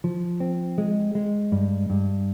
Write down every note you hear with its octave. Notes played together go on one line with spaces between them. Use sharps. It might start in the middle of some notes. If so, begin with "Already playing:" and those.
F3
C4
G#3
G#3
G2
G2